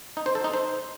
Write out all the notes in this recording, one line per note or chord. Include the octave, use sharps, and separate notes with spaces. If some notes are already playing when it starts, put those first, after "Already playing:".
D#4
C5
A4
D#4
C5